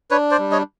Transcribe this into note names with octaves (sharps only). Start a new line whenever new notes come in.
D4 B4 C#5
C5 D5
G3
C#5 D#5